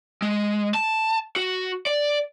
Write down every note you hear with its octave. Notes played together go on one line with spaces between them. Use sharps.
G#3
A5
F#4
D5